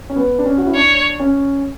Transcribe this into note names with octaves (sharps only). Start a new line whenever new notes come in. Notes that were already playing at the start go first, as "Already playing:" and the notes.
C#4
B3
D4
C#4
F#4
E4
D4 C#5
C#4